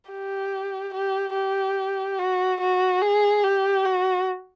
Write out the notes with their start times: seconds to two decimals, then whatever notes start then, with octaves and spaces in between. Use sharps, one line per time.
0.11 G4
0.94 G4
1.35 G4
2.19 F#4
2.61 F#4
3.02 G#4
3.44 G4
3.85 F#4